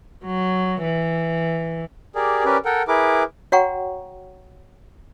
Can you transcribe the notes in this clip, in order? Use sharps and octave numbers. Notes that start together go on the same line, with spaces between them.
F#3
E3
G4 G#4 A#4 D5
C#4 G4 A#4 B4 D5
A4 A#4 F#5 G5
E4 G#4 A#4 B4 D6
F#4 C#5 F#5 G5 A#5 C#6